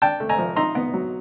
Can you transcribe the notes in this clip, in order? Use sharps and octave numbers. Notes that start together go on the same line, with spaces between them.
D4 G5 A5
A3
G#5 A#5
F3
D#4 A#5 C6
B3
F#3